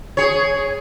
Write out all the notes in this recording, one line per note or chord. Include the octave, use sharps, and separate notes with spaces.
G#4 C#5